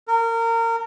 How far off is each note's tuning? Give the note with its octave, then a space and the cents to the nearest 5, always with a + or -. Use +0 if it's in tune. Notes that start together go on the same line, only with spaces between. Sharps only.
A#4 -25